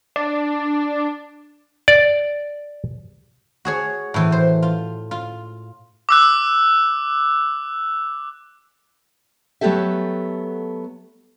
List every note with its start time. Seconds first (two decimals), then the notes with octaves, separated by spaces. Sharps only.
0.16 D4
1.88 D5
3.65 F#4 G#4 C#5
4.14 A2 E3
4.32 C5
4.62 F4
5.11 F4
6.09 D6 E6 F#6
9.61 F#3 A3 B3 G4 A4 E5